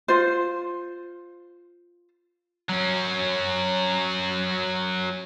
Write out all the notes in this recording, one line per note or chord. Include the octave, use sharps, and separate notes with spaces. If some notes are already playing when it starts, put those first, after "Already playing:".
F4 C5
F#3 C#4